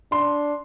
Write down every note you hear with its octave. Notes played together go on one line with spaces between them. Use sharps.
D4 C6